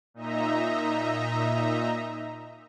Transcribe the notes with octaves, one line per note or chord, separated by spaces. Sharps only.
A#2 D#4 D#5 E5 A#5